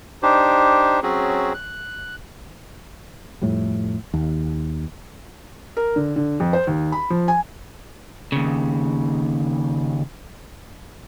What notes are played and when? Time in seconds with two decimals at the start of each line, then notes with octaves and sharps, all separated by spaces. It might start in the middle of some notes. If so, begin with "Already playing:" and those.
0.23 D4 D#4 G4 C5
1.03 F#3 C4 C#4 F#4 G#4
1.54 F#6
3.42 F2 A2 G3
4.14 D#2
5.77 A#4
5.96 D3
6.16 D3
6.40 F2
6.53 C5
6.67 D#2
6.92 B5
7.10 F3
7.28 G#5
8.32 D#2 C#3